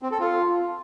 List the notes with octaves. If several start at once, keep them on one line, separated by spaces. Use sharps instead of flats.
C4
A4
F4